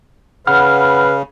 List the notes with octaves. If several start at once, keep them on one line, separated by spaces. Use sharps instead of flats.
C#3 B4 F5 F#5 B5 F6